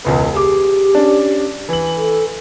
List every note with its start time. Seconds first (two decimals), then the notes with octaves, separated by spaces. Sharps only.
0.05 E1 C#2 B3
0.34 G4 G#4 D6
0.95 C#4 D4
1.69 E3 F#7
1.97 A4